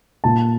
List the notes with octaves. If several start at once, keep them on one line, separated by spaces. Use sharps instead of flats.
A#2 A5